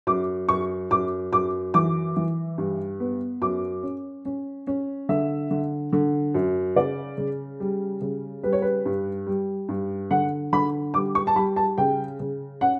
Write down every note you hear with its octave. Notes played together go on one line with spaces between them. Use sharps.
F#2 D6
F#2 C#6
F#2 D6
F#2 D6
E3 D6
E3
G2
B3
F#2 D6
C#4
C#4
C#4
D3 E5
D3
D3
F#2
C#3 D5
C#3
G3
C#3
G3 B4
C#5
B4
G2
G3
G2
D3 F#5
D3 B5
G3 D6
C#6
A5
G3 B5
A5
C#3 G5
C#3
C#4 F#5